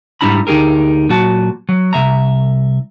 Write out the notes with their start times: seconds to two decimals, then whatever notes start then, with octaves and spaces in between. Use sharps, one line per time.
0.21 G#2 G3 D4 E4 A#5 B5
0.47 D2 D#4 G4 G#4 A#4
1.09 A#2 F#3 F#4 A5
1.69 F#3
1.93 C2 E3 E5 A#5